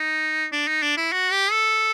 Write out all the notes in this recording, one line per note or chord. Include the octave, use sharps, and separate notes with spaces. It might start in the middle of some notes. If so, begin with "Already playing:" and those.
Already playing: D#4
D4
D#4
D4
E4
F#4
G4
A4